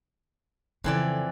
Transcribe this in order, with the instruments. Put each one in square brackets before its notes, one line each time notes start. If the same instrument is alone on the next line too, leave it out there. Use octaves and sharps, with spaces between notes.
[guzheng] F2 E3 D5 [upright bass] C#3